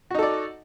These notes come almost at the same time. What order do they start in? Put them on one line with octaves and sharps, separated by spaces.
F#4 D#4 A4 D5